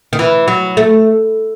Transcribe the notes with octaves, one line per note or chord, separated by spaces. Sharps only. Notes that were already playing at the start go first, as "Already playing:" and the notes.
D#3
E3
F#3
A3